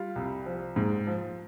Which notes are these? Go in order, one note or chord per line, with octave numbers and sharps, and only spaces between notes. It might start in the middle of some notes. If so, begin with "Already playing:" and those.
Already playing: G3 F4
C2
F3
G#2
F3